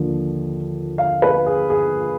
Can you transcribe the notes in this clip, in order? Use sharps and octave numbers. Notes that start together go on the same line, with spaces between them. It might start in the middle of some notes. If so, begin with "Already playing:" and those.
Already playing: D#2 D3 F3
F5
B4
G#4
G#4